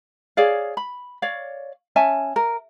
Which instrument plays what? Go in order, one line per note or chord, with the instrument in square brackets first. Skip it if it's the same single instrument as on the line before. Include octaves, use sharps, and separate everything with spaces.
[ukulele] G#4 C#5 D5 F5
B5
C#5 D5 F5
C#4 E5 G#5 A5
A#4